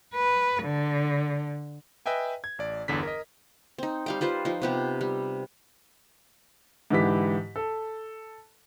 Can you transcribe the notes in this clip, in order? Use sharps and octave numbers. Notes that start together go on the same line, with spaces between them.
B4
D3
B4 D#5 E5 G5 G#5
G#6
A1 D5
G1 E2 D3 B6
A#4 D#5
C4 D#4
G3 F5 G5
G3 F4 B4 C5
F3 D#4
C3 B3 G4
G3
G#2 D3 E3 E4 G4 B6
A4